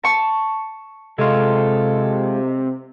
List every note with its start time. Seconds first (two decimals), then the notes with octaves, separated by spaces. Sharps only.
0.04 A5 C#6
1.18 C3 G#3 F4 A4